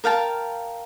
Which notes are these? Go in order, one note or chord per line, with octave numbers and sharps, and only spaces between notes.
A#4 F5 G5 A5